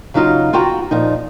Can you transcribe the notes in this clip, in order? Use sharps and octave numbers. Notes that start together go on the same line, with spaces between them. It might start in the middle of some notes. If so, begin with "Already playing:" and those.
C#3 F#3 D#4 F4
B3 F4 F#4 G5 A#5
A#2 F3 D#4